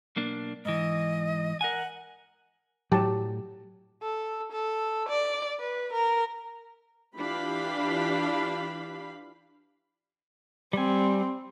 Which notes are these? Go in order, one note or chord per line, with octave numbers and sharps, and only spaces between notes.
B1 A#3 D4
G#2 E3 D#5
A#4 F#5 G#5
A2 F#3 G4 A5
A4
A4
D5
B4
A#4
E3 D4 F4 G4 F5 B5
G3 C4 G#5